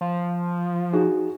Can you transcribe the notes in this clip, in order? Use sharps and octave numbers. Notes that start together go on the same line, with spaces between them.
F3
D#4 F#4 G#4